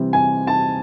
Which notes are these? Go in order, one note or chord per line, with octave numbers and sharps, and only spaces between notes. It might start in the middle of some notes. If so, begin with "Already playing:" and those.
Already playing: C3 E3 G3 C4
G#5
A5